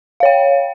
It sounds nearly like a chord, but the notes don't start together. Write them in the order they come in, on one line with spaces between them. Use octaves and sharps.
F5 C#5 G5